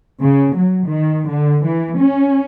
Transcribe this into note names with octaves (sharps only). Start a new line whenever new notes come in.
C#3
F#3
D#3
D3
E3
C#4